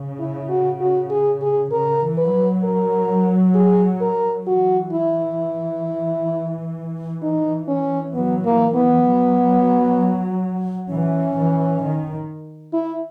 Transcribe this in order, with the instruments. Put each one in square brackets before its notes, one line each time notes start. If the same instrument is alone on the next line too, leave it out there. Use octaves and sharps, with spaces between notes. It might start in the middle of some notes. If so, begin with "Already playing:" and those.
Already playing: [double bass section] C#3
[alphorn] E4
F#4
F#4
G#4
G#4
[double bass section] C#3 [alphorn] A#4
[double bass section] E3
[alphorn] B4
[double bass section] F#3
[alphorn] A#4
G#4
A#4
[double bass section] E3 [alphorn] F#4
[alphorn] E4
D#4
C#4
[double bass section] F#3 [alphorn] B3
[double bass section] E3 [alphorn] A#3
[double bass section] E3 [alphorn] B3
[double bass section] F#3
[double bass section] E3 [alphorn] C#4
[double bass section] E3
D#3
[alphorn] E4